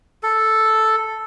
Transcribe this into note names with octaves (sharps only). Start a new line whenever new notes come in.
A4